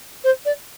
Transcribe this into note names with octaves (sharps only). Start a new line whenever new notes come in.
C5
D5